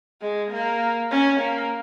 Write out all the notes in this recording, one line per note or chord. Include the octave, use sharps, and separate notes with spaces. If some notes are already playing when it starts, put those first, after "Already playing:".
G#3
A#3
C#4
A#3